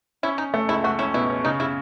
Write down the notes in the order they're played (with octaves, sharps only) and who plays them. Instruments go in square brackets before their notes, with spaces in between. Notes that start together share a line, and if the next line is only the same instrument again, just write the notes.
[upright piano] C#4 [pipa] E4
[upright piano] C#4 [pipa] D#4
[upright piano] A3
[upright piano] C#2 [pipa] E4
[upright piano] A3 [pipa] F#4
[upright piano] C#4 [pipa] E4
[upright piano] B2 [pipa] E4
[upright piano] C#4
[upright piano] C#3 [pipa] D#4
[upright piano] C#3 [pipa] E4